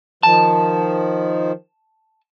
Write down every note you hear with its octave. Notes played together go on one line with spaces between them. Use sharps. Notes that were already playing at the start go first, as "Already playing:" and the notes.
D#3 F3 A5